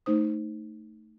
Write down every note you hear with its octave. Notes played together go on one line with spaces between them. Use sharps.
A3 D#4 C5 D#6